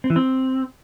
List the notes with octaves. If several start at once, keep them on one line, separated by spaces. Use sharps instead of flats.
C4
E3
C4